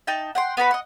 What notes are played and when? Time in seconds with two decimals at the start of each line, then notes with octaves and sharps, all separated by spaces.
0.07 D#4 G5 A5
0.35 F#5 G5 C6
0.57 B3 F#4 B4 B5
0.71 D#5 F#5